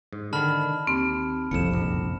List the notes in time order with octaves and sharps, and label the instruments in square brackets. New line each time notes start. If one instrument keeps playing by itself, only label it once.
[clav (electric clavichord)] G#2
[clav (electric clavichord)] D3 D#3 [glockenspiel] A5 B5 F6
[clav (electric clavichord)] D#2 [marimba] C4
[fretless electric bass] F#1 C2 F2 [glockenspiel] C#7 E7
[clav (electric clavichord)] A#1